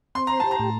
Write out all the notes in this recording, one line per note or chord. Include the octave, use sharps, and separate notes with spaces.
C4 C6
C5 A#5
G4 A5
A#5
A2